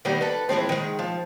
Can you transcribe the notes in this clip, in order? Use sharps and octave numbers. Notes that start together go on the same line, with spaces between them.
D#3 G3 B3 D#4
A4 B4
E3 F3 G#3 C4
D#3 G#3
F3